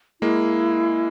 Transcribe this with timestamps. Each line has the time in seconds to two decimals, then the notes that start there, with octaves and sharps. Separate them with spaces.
0.21 G#3 A#3 E4